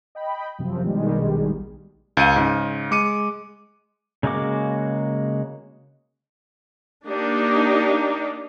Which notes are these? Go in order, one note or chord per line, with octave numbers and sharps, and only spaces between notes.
D#5 G5 B5
F#2 C3 F3 C4
A#1 B2 D#3 G3 G#3
C#2 F5 D#7
G#2 C#3
G#3 D6 C#7 D#7
C#3 G#3 A#3 F#4 D6
A#3 D4 D#4 G4